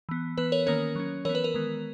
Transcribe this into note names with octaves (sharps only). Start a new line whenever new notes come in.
E3 B3
E3 B3 B4
A#4 C#5
D#3 A#3 C#4 A#4 C#5
F#3 C#4
E3 B3 A#4 C#5
B4
A#4
D#3 G#3 B3